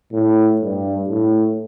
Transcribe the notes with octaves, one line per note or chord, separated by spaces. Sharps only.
A2
G2
A2